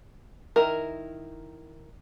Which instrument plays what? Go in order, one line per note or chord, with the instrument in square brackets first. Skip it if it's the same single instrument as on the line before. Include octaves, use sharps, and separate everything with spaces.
[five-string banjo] D#3 E4 A#4